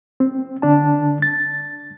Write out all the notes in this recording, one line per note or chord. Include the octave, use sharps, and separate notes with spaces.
C4
D3 D4 A5
A6